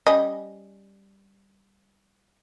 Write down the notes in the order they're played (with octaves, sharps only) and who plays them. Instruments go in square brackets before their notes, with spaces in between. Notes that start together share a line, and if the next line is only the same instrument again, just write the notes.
[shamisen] G3 C#4 D#5